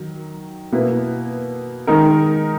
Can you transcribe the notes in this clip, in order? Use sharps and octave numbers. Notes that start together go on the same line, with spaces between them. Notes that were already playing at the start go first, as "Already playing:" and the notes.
Already playing: D#3 F#3
B2 A#3 E4 B4
D#3 G#3 D#4 A#4